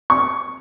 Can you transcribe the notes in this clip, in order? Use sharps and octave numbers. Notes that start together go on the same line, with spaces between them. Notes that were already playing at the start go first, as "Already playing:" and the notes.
C#6